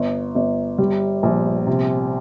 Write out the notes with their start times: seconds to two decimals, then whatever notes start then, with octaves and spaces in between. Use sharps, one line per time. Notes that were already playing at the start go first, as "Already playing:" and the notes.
Already playing: G1
0.35 G1
0.78 G3
1.23 A#1
1.67 C3